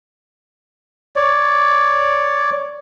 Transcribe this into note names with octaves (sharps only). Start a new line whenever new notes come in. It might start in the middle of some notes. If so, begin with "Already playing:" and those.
C#5 D5